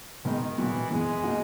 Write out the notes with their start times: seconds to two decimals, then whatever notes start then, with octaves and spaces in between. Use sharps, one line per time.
0.25 B2 D#3 G#3 B3 D#4
0.58 A#2 E3 F#3 B3 F#4
0.91 F#2 E3 G#3 B3
1.24 B2 A#3 D#4 F#4